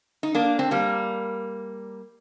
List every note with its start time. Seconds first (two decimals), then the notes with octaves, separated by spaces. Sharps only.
0.23 D#4
0.35 A#3 D4
0.59 C4
0.71 G3 A#3